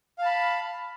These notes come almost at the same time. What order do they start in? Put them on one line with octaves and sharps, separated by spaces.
F5 A5 B5